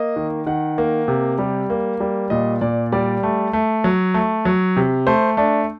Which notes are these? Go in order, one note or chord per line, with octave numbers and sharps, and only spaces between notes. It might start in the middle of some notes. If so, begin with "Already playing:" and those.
Already playing: A#3 D#5
D#3
D#3 F#5
A#3
C3
G3
A#3
G3
A#2 D#5
A#2 D5
G3 D5
A3
A3
F#3
A3
F#3
C3
A3 C5
A3 D4